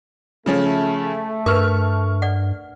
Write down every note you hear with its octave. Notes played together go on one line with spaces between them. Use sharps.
C#3 F3 A3 C#4
G2 A#4 B4 C#6 F6
D5 F#5